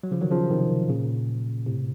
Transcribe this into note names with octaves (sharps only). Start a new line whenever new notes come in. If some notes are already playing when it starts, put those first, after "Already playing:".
F#3
C#3 F3
D#3 F#3
C#3 F3
C3 D#3
A#2 C#3
A2 C3